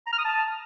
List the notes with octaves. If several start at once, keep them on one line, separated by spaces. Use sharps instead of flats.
A#5
F6
D#6
A5